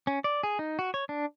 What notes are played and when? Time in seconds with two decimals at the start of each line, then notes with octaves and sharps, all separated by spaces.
0.07 C#4
0.24 D5
0.43 G#4
0.59 D#4
0.79 F#4
0.94 C#5
1.09 D4